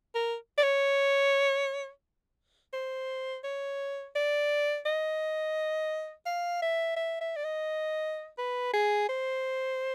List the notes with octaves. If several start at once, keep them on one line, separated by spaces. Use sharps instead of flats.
A#4
D5
C#5
C5
C#5
D5
D#5
F5
E5
E5
E5
D5
D#5
B4
G#4
C5